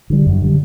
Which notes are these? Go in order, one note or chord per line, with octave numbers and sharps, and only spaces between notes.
D3 G3
F#2
D3 G3